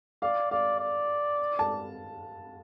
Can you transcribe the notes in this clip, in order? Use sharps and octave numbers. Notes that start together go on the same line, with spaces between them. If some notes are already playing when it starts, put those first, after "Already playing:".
D5 F5
D5 F5
D5
A5